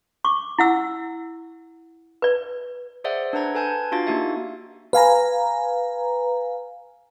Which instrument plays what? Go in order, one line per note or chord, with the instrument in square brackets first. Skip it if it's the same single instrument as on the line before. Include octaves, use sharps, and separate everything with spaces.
[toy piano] C#6 D6
E4 F#5 E6
B4 D5
[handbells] G#4 C5 D5 E5 F#5
D4 B4 F#5 A#5 G#6
A4 B4 G#5 A5 G6 G#6
D4 F4 F#4 F5 A6
A#3 D4 D#4 F#4 G4 E5
[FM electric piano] B4 F5 G#5 A#5